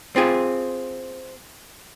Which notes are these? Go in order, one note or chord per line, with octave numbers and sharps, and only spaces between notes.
C4 F4 G#4